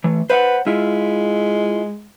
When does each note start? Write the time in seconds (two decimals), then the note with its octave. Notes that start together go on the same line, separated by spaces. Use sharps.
0.04 E3 A3
0.30 B4 C5 F5 F#5
0.67 G#3 E4 F4